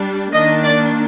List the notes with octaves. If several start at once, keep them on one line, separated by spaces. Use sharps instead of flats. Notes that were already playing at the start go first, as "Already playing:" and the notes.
Already playing: G3 D4
D#3 A#3 D4 D#5
D5